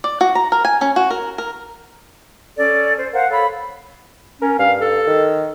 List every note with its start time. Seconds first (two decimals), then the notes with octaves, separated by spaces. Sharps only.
0.04 D5
0.21 F#4
0.35 A#5
0.52 A#4
0.65 G#5
0.81 C#4
0.96 F#4
1.10 A#4
1.38 A#4
2.57 C#4 A4 D5
2.97 C5
3.12 A#4 C5 F5 F#5
3.29 A4 C#5 F5 B5
4.42 C#4 A#4
4.59 G2 F5
4.81 A4
5.07 D#3